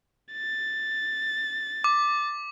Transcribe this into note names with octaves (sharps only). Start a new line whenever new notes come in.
A6
D6